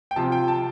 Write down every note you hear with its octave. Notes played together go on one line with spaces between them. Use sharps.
G5
C3 F3 C4 F4 A5
G5
A5